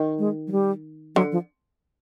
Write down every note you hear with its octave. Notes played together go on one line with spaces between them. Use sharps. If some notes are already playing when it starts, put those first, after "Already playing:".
Already playing: D#3
G#3
F#3
G3
D3 F#3
F3